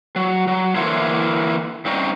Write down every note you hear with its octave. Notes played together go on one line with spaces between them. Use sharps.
F#3
F#3
D3 E3 A#3 E4 C5 C#5
G2 C4 C#4 D#4